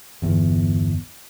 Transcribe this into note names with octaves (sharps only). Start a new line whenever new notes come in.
G1 E2